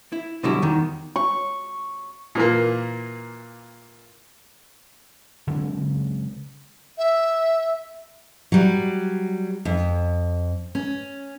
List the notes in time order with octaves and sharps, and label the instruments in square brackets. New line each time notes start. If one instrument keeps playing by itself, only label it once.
[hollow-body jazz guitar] E4
B2 D3 F#3 G3 C#4 E4
E2 D#3
[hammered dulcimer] C#6
[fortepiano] A#2 E3 A#3
[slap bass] C#3 F#3 G#3 C4
[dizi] E5
[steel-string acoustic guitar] F#3 G3
F2
C#4